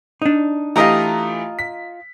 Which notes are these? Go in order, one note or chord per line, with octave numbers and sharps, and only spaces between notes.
D4 D#4
E3 A3 F4 G4 D#5 A#5
B6